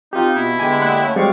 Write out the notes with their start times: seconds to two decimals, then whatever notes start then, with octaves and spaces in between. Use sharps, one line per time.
0.13 C4 D#4 F4 G4
0.35 B2 B3 E4
0.60 D3 G#3 B3 G4 G#5
0.82 A#3 F#5
1.01 A3 C#4
1.16 G3 G#3 C4 F#4 D5 F5 C#6